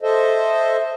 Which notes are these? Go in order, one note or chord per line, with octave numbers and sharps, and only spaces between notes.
A4 C5 D#5 E5